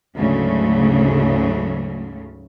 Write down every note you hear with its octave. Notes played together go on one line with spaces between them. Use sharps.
D2 G#2 C#3 F#3 A3